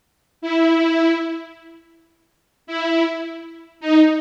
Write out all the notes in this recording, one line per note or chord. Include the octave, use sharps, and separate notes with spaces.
E4
E4
D#4